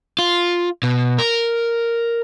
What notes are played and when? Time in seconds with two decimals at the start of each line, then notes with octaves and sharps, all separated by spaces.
0.19 F4
0.83 B2
1.19 A#4